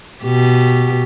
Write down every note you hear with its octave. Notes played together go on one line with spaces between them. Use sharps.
B2 G4